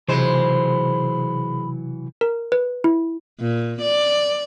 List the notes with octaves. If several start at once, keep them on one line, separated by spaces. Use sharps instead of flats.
C3 E3 F#3 G#3 C5 B5
A#4
B4
E4
A#2
D5